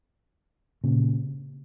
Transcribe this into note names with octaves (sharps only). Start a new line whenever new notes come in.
A#2 C#3